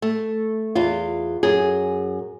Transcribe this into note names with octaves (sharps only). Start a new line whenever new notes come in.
A3
E2 F4
F#2 G#4